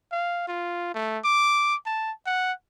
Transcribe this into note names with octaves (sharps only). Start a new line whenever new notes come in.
F5
F4
A3
D6
A5
F#5